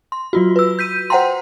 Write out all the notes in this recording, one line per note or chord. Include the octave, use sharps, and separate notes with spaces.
C6
F#3 F4 F#4
B4 E6
G6 B6 D#7
C5 F#5 G5 A#5 C6